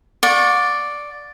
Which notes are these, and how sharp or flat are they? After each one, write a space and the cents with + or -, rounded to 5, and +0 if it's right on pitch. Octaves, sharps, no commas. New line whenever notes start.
D5 +0 F#5 -45 C#6 -15